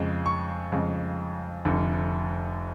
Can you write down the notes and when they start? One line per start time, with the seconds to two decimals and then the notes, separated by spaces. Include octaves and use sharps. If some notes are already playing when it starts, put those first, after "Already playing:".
Already playing: F2 C#3 G#3
0.26 C#6
0.72 F2 C#3 G#3
1.65 F1 F2 D3